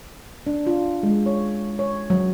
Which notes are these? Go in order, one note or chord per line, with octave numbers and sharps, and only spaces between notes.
D4
F4
G#3
C#5
C#5
F#3